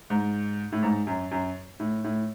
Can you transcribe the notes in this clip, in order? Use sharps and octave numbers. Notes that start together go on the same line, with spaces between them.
G#2
A2
G#2
F#2
F#2
A2
A2